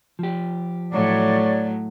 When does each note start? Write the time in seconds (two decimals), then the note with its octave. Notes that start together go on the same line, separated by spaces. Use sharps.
0.19 F3 G4
0.92 A2 F#3 A3 C#5 D5